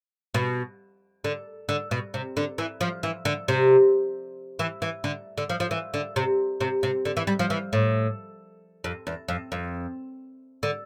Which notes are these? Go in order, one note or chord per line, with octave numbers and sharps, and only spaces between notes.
B2
D3
D3
B2
C3
D3
E3
F3
E3
D3
C3
E3
E3
D3
D3
F3
F3
E3
D3
C3
C3
C3
D3
E3
G3
F3
E3
A2
F2
E2
F2
F2
D3